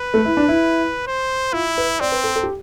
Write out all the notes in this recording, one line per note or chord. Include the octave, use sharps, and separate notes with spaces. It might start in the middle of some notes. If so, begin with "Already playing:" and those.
Already playing: B4
A3
E4
D4
E4
C5
E4 F4
B4
C4 D5
B4
A4
A4
G4